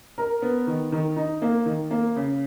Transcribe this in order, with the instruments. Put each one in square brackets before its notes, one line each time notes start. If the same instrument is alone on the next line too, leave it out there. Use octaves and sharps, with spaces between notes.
[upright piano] A#4
B3
D#3
D#3
D#4
A#3
D#3
A#3
C#3